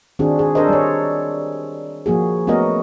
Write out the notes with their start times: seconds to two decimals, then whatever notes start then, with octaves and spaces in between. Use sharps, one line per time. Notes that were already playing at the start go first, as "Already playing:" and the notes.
0.19 D#3 C4 D4 F#4 G#4
0.39 G#4
0.55 D4 A4 A#4 C5 D#5
0.69 G3 C#5
2.06 F3 A#3 F#4 G#4
2.47 A3 B3 C#4 F#4 A#4 D#5